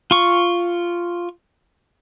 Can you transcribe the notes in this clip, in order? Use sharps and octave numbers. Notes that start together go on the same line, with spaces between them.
F4 C#6